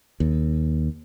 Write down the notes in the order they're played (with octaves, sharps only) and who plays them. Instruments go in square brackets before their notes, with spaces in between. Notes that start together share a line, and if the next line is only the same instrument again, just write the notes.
[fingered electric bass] D#2